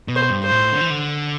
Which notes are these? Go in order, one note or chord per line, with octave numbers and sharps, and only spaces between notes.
B2
C5
G2
C5
A2
D3
E3
D3